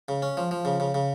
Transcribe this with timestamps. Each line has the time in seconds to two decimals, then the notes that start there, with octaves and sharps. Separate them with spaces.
0.08 C#3
0.22 C#4
0.37 F3
0.51 F3
0.65 C#3
0.80 C#3
0.94 C#3